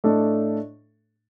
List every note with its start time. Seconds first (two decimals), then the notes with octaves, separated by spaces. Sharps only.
0.04 A2 A3 D4 A4 D#5